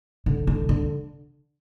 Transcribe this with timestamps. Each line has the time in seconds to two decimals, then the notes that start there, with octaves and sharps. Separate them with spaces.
0.26 D3
0.47 D3
0.69 D3